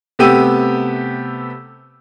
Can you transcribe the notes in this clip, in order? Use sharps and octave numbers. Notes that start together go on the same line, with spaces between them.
C3 A3 B3 G4 E6 D#7